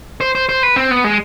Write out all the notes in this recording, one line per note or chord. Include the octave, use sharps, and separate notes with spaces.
C5
C5
C5
B4
C4
B3
G#3